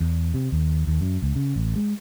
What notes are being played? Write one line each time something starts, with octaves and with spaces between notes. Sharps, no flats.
E2
C3
D#2
D#2
F#2
C#2
C#3
A1
G#3